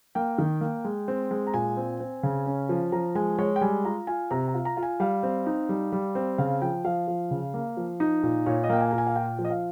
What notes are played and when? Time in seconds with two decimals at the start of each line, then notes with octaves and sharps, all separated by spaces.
0.15 A#3 G5
0.38 D#3
0.61 A#3
0.85 G#3
1.08 C4
1.31 G#3
1.47 A#5
1.54 A#2 G#5
1.77 C4
2.00 C4
2.23 C#3
2.46 C#4
2.69 F3
2.92 F3 A#5
3.15 G#3 G#5
3.39 G#3 C#5
3.56 G5
3.61 G3 G#5
3.84 F4 A#5
4.07 F4 G#5
4.31 C3 A#5
4.48 A#5
4.54 F4
4.65 A#5
4.77 F4
4.83 G#5
5.00 G3 F5
5.23 C4
5.46 D#4
5.69 G3
5.92 G3
6.15 C4
6.38 C#3 F5
6.62 F3 G5
6.85 F3 F5
7.08 F3
7.31 C#3
7.54 A#3
7.77 F3
8.00 D#4
8.23 A#2
8.46 A#2 C#5
8.64 D#5
8.69 A#3 G5
8.81 G#5
8.91 A#2 A#5
8.98 G#5
9.07 F5
9.16 F4 G5
9.39 F3
9.45 D#5
9.50 F5